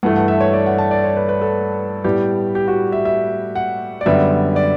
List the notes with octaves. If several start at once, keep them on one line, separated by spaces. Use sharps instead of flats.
G2 E3 A3 F#5
F#5
E5
C#5
D5
F#5
A5
D5
C#5
B4
B4
A4
A2 G3 B3 G4
G4
F#4
E5
E5
F#5
D5
F#2 D3 G3 B3 E5
D5